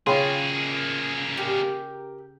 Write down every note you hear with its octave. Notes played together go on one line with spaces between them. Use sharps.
C#3 A#3 C#4 F4 G#4 G5 B5 C6
G4 A#4